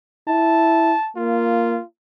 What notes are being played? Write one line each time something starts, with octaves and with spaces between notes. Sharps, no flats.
E4 A5
A#3 F4